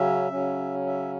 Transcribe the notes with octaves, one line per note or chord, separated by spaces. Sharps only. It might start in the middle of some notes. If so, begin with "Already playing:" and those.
Already playing: C#3 F#3 C#4 E5
C#3 F#3 C#4
E5